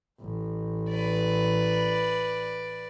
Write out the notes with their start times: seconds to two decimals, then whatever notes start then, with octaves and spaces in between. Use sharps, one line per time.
0.20 A1
0.90 B4 D5